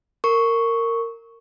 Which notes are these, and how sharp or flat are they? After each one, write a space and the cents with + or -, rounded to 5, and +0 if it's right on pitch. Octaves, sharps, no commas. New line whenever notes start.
A#4 -15 C#6 +0